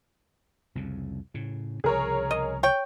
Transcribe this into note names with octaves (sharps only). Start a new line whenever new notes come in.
C2 F2 C#3
A2 C#3
C2 C#3 F3 G#4 A#4 C#5
D#5
C#5 G5